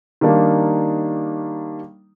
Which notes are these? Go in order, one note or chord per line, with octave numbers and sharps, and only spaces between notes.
D#3 G3 A#3 D4 D#4